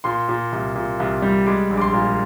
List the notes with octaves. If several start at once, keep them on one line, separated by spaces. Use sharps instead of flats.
A#2 C6
A#2
C2
A#2
C2
G3
G#3 D6
A#1
D6
C6
A#2